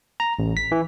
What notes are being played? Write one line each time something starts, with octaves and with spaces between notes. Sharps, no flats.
A#5
A1
B6
E3